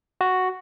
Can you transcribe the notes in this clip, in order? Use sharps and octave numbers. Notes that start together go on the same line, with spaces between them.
F#4